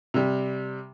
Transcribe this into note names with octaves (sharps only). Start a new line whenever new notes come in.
C3 G3